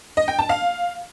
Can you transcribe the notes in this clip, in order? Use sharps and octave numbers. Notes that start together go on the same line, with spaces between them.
D#5
G5
A5
F5